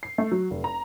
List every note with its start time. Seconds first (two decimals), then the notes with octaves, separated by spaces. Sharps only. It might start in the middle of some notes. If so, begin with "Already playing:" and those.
0.03 C7
0.18 A3
0.31 F#3
0.50 F1
0.64 A#5